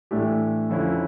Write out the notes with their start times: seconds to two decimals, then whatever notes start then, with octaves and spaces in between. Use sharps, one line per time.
0.11 A2 E3 A3 D4 G4
0.70 F2 D3 F3 C#4 E4